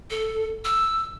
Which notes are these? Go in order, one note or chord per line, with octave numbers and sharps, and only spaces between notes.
A4
E6